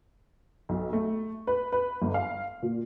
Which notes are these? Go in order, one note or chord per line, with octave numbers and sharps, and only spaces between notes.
B1
A3
B4
B4
G1
F5
A#2